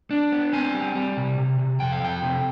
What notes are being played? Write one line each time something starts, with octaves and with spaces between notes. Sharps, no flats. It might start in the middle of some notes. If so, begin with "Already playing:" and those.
D4
B3
C4 G#5
G3
G3
C3
C3
C3
F2 G5
F5
F2 G5
C3